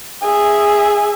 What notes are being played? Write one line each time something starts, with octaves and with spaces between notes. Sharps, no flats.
G#4 E5